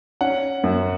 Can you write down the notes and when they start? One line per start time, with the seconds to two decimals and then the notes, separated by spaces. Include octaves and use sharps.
0.21 C#4 F#5
0.64 F#2